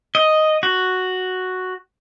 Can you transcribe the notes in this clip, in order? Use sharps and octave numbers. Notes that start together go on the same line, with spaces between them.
D#5
F#4